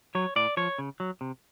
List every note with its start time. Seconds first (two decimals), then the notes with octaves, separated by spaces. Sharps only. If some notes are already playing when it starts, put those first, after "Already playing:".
0.15 F#3 C#5
0.36 A2 D5
0.57 F3 C#5
0.78 C#3
1.00 F#3
1.21 C3